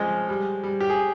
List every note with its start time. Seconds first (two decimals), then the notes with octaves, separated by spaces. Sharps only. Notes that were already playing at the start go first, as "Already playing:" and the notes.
Already playing: C#2 F3 G#3
0.29 G3
0.63 G3
0.80 G4
0.90 G#4